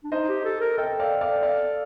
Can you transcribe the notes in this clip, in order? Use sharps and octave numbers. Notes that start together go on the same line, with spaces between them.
D4
D#4 C5 D#5
G4
A4
A#4
A4 D#5 G5
D5 F5
D5 F5
D5 F5